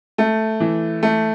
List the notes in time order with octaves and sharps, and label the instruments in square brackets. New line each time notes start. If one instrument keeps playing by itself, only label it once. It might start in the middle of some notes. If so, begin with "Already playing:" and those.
[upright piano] A3
E3
A3